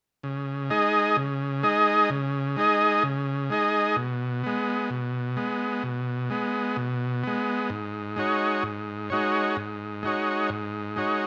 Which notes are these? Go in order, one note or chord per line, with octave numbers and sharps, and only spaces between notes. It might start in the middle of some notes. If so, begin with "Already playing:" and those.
C#3
G#3 D#4 G#4 D#5
C#3
G#3 D#4 G#4 D#5
C#3
G#3 D#4 G#4 D#5
C#3
G#3 D#4 G#4 D#5
B2
G#3 B3
B2
G#3 B3
B2
G#3 B3
B2
G#3 B3
G#2
G#3 D#4 F#4 C#5
G#2
G#3 D#4 F#4 C#5
G#2
G#3 D#4 F#4 C#5
G#2
G#3 D#4 F#4 C#5